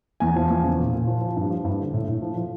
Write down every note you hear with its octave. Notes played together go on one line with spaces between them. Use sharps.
E2 G#5
F3
E2
C#3
A#2
A#2
F3
F3
G2
F3
G2
D3
A2
A2
F3
F3